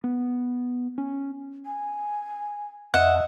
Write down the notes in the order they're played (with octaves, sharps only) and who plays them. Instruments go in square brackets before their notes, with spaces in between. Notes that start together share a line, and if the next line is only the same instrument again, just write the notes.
[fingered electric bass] B3
C#4
[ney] G#5
[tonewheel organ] F2 [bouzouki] D#5 E5 [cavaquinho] F#5